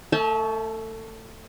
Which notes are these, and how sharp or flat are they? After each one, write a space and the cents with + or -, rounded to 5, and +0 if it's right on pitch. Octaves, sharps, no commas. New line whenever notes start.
A3 +25 E5 -35 A5 -30